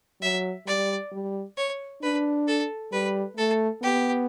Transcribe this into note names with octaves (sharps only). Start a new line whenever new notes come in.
F#3 E5
G3 D5
G3
C#5
D4 B4
A4
G3 B4
A3 A4
B3 G4